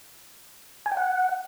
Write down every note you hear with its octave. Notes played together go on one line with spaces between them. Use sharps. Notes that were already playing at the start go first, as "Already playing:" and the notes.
G#5
G5
F#5